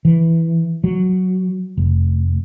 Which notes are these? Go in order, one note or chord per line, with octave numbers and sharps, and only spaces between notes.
E3
F#3
F1